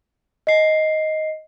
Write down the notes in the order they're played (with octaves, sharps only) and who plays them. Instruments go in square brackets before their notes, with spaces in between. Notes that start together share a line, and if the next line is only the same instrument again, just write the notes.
[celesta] D#5 C7